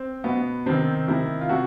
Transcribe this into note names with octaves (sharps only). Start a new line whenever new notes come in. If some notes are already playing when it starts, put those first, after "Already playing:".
Already playing: C4
B2 B3
C3 D#3 C4
C3 D#3 E4
F4
C3 F#4